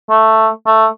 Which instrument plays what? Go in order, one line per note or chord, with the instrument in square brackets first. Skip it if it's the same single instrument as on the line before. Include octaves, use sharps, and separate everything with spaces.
[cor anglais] A3
A3